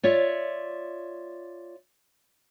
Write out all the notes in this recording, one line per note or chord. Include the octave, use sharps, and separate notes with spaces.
F4 C#5 D5 E5